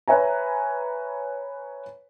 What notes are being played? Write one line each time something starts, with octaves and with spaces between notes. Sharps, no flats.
B4 C#5 E5 G#5 A#5